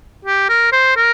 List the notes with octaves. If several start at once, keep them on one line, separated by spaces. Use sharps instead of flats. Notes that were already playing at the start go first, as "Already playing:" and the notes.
G4
A#4
C5
A#4